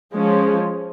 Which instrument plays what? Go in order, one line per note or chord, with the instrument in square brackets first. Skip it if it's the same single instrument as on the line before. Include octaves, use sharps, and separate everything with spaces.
[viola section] F3 G#3 C#4